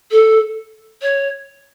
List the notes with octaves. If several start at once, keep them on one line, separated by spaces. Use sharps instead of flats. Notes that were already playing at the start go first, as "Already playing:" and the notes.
A4
C#5